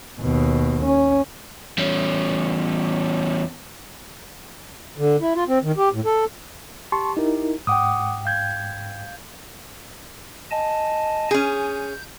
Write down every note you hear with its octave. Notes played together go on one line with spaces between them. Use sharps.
D#2 B2
C#4
E2 C#4
D3
E4
F4
C4
D#3
G4
A2
A4
G4 A5 C6 C#6
D#4 E4 A#4
G#2 F#5 G5 D6 D#6
F5 G6 G#6
D#5 G#5 A5
C#4 G#4 G6